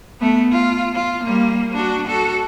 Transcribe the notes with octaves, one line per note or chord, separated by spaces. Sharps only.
A3 B3
F4
F4
G3 A#3
D4 F#4
F#4 A4